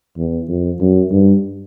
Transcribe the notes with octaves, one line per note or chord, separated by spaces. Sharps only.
E2
F2
F#2
G2